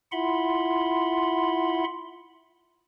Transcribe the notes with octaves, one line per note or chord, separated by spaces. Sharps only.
E4 F4 E5 F#5 B5 C6